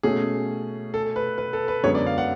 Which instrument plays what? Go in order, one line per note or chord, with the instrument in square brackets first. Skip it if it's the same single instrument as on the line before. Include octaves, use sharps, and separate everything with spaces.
[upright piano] B2 A3 C#4 F#4 [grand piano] G#4
[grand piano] A4
B4
B4
A4
B4
[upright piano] F#2 D3 G#3 B3 [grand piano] C#5
[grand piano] D5
F5
F#5